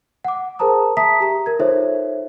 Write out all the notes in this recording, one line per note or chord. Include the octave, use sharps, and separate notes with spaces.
F#5 D6
G#4 A#4 C5 A5 A#5 D#6
E5 A5 A#5 D#6 B6
G4 A#5
A#4 G#6
D#4 F4 A4 C5 C#5 E5